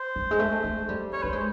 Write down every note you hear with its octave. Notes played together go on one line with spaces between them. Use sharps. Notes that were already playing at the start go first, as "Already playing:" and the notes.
Already playing: C5
G3
G#3
A3
G#3
G3
C#5
A3 B4
G#3 C5